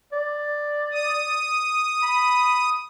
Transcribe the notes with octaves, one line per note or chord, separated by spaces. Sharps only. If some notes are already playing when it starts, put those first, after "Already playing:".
D5
D#6
B5